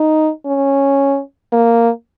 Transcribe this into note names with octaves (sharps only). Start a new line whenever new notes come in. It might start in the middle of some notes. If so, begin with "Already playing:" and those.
Already playing: D#4
C#4
A#3